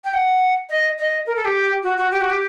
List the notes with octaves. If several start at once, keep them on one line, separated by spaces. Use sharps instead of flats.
G5
F#5
D#5
D#5
A#4
A4
G4
F#4
F#4
G4
F#4
G4